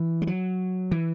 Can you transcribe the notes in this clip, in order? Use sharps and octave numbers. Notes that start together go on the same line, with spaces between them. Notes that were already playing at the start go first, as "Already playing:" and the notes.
Already playing: E3
G#3
F#3
E3